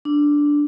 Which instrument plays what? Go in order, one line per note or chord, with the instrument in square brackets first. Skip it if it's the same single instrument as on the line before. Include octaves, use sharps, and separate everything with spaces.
[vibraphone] D4